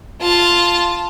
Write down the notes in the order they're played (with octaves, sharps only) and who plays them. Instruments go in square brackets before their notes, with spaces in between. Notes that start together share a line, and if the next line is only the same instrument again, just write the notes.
[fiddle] F4 A5